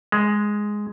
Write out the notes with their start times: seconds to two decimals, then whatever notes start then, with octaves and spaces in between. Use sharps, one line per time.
0.12 G#3